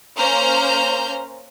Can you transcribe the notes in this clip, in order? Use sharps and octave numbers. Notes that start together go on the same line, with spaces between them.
A#3 C#4 C5 A#5 F6 G6